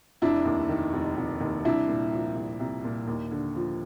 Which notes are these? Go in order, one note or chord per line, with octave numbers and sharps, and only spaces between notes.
F1 D4 E4
D#2
D#3
F1
F1
D#2
C2 D4 E4
A#2
F3
C2
C2
A#2
D#2
D3
F3